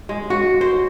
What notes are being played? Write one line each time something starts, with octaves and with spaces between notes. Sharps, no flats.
G#3
F#4
C5